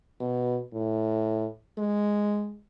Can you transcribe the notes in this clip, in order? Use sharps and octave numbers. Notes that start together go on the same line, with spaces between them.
B2
A2
G#3